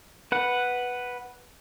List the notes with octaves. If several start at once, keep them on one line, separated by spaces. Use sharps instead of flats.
B4 F#5